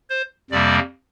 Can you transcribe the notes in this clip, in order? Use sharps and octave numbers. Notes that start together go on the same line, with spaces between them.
C5
F2 C3 G3 A#3 D5